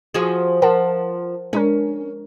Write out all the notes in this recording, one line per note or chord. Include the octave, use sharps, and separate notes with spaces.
F3 F#4 G#4
F3 A#4 F#5 A5
G#3 C#4 D4 A#4